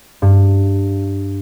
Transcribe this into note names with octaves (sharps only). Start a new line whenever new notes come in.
G2